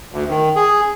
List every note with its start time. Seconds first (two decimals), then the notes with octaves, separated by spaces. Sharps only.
0.12 D2
0.29 D#3
0.56 G#4